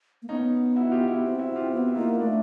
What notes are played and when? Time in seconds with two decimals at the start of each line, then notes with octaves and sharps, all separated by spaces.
0.22 A#3
0.29 B3 C#4 D#4
0.76 E4 F#4
0.92 F4 G4
1.08 E4 F#4
1.24 C4
1.39 E4 F#4
1.56 F4 G4
1.71 B3 E4 F#4
1.88 E4
1.95 A#3 D#4 F4
2.19 A3 D4 E4